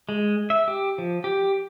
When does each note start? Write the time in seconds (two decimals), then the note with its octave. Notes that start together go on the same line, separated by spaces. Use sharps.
0.09 G#3
0.50 E5
0.68 G4
0.98 F3
1.24 G4